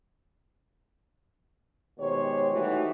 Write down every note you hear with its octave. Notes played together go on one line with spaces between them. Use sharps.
B2 D#3 G#3 G4 C5 C#5
E3 G3 A3 D#4 F#4